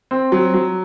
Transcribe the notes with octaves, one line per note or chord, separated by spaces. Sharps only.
C4
F#3
F#3